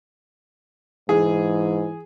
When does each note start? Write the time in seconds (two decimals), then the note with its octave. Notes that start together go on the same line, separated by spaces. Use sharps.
1.09 G#2 E3 G#4